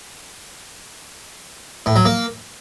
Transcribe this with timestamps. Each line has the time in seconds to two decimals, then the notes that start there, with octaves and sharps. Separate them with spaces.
1.86 A2
1.96 F#3
2.05 A#3